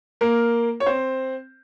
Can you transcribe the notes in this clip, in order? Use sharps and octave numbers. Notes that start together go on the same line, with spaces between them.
A#3 A#4
C#5
C4 C5